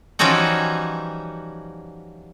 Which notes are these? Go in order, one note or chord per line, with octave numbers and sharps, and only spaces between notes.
E3 F3 G3 C#4 D#4 F#4